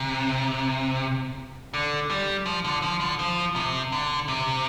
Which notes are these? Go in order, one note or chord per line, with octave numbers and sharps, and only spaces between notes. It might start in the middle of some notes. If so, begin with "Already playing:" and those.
Already playing: C3
D3
G3
F3
D3
F3
D3
F3
C3
D3
C3